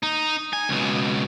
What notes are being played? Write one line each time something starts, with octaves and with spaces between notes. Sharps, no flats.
D#4
G#5
C#2 B2